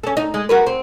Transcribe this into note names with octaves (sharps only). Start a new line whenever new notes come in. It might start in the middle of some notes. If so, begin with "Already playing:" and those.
C#4 A4
D#4
G#3
F#4 A#4 B4
C4